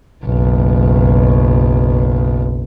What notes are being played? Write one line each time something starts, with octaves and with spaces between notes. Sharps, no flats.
F#1 B1